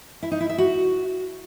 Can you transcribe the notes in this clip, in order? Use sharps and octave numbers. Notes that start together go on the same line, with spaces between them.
E4
D#4
E4
E5
F#4